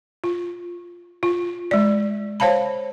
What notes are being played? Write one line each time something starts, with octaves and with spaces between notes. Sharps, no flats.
F4
F4
G#3 D5
C5 C#5 F5 A5 B5